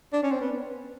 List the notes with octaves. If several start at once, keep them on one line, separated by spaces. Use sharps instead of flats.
D4
C#4
C4
B3